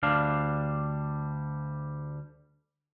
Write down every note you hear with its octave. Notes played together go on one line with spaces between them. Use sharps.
D2 G3 D4 F5